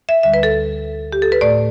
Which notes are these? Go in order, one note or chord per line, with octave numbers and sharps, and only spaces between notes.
E5
D2 D3 G3 E5
B4
A4
G4
A4
B4
A2 A3 D5